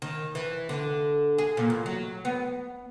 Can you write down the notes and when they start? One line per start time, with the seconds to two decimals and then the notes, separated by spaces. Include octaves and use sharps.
0.02 D#3
0.35 E3
0.69 D3
1.38 G#4
1.57 A#2
1.70 E2
1.86 F#3
2.25 B3